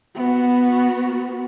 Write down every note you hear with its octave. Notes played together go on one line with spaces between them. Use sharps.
B3 F#4